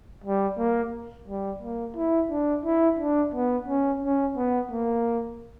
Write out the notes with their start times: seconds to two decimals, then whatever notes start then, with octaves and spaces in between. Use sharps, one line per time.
0.24 G3
0.58 A#3
1.28 G3
1.62 A#3
1.97 E4
2.30 D4
2.65 E4
2.99 D4
3.34 B3
3.68 C#4
4.02 C#4
4.37 B3
4.71 A#3